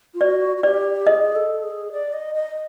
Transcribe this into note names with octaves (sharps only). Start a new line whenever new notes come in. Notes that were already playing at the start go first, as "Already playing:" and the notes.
F4
F#4 D5
F#4
G4 D5
G#4 D#5
A4
G#4
D5
D#5
D#5